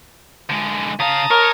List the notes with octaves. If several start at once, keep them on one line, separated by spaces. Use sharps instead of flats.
D3 G#3
C#3 F5 A5 A#5 D#6
A#4 C#5